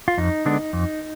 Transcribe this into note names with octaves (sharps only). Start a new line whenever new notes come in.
F4
F2 D#4
D3 G#3 B3 D4
F2